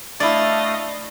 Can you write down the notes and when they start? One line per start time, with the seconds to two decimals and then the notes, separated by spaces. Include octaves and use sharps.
0.20 A3 D4 E4 D5 D#5 F5